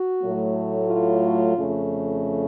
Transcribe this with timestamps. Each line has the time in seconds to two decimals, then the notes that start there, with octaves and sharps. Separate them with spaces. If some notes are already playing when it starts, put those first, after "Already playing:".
Already playing: F#4
0.21 A2 F#3 A3
0.87 F4
1.54 F2 C#3 A3